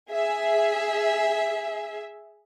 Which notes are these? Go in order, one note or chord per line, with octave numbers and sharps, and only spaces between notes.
G#4 E5